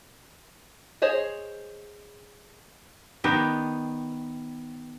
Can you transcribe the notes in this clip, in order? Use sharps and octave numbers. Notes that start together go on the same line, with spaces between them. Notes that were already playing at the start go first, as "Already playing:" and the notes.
G#4 C5 C#5 D#5
D#3 B3 G4 D5